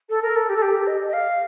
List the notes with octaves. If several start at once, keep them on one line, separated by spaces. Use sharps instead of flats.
A4
A#4
A4
G4
A4
G4
D#5
D#5
F5